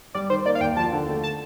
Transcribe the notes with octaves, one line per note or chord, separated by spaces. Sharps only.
G3 D5
D#3 C5
A#3 D5
F5
D#2 G5
F3 A5
D3
A3
A5